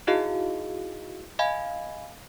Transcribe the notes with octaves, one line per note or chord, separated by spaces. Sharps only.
D#4 E4 F#4 G#4 D#5 F5
D#5 F5 G#5 B5 G#6